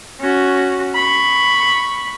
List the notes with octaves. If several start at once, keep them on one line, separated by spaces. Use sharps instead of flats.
C#4 F#4
B5 C#6